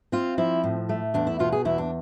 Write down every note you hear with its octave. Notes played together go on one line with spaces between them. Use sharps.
C4 F4
F3 E4
A2
A3
E2 D4
E4
B2 F4
G#4
E2 E4
D4